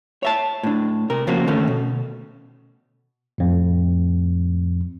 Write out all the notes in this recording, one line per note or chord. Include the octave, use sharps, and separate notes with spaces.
C#5 E5 A5
A2 D4
C3 A#4
C#3 F3 A#3 C4 C#4 F#4
D3 D#3 A3 B3 C#4
B2
F2 A2